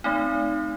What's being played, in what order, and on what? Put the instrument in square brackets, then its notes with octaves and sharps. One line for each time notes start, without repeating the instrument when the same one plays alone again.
[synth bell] A3 C4 D#4